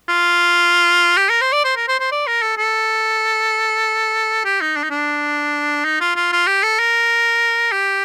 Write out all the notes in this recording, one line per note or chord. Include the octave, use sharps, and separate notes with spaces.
F4
G4
A#4
C5
D5
C5
A#4
C5
C5
D5
A#4
A4
A4
G4
D#4
D4
D#4
D4
D#4
F4
F4
F4
G4
A4
A#4
G4